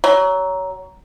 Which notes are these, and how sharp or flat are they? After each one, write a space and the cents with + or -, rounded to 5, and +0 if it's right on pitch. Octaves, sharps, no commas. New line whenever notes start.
F#3 +20